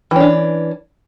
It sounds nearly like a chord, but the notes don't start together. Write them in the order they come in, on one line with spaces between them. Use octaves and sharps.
E3 C#4 D4